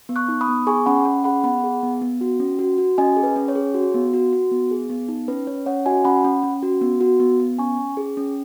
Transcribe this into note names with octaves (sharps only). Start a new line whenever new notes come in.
B3
C#6 F#6
D#4
B5 D#6
B3
G#4 G#5 C#6
C#4 F#5 B5
C#4
G#4 F#5 B5
B3 F#5 B5
G#4
B3
B3
F#4
C#4
F#4
F#4
C#4 D#5 G#5
G#4
B4
C#4
C#5
G#4
F#4
B3
F#4
F#4
B3
G#4
B3
D#4
C#4 B4
C#4 C#5
C#4 C#5 F#5
F#4 D#5 G#5
C#4 F#5 B5
C#4
C#4
F#4
B3
F#4
B3
B3
C#4 G#5 C#6
C#4
G#4
C#4